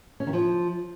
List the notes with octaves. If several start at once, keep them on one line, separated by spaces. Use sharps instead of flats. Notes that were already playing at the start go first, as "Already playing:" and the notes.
C#4
D#3
F3